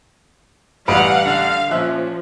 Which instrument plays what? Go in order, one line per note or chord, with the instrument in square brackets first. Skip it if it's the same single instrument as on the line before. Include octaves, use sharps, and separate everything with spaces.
[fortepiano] A1 G3 [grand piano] B4 D#6 D7 [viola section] F5 F#5
[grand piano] D3 [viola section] F5
[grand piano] A#2 C#4 F#6 [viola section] F3 [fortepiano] E5